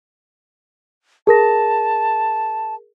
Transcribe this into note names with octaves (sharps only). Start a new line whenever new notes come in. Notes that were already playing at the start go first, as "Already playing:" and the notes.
G#4 A#4 A5 A#6